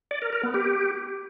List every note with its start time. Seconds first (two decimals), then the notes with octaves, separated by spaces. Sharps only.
0.11 D5
0.22 A#4
0.33 A#4
0.43 B3
0.54 G4